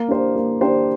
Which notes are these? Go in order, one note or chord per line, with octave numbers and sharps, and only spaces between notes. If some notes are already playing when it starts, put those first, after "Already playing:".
Already playing: A#3
D4 G4 C5
A#3
D4 G4 C5